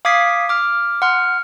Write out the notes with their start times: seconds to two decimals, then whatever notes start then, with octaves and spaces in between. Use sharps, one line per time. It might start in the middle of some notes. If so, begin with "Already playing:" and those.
0.05 F5 D6 D#6 G#6 B6 C7
0.49 D6 F6
1.02 F#5 C6 F6